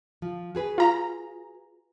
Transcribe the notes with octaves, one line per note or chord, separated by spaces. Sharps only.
F3
F#4 G#4 B4
F4 A#5